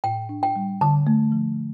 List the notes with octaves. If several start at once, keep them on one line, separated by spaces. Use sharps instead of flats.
A2 G5
D4
G5
G3
D3 A5
A3
F3